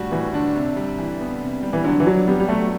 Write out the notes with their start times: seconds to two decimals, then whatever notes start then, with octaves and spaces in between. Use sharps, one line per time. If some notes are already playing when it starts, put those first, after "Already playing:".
Already playing: A2 G3 D4 F#4
0.12 A2 E3
0.33 D3 D4
0.55 C3
0.76 G3
0.98 E3
1.20 B3
1.42 C3
1.63 G3
1.73 E3
1.84 D3 F#3
2.00 E3
2.06 F#3 D4
2.27 G3 B3
2.40 G3
2.48 F#3 A3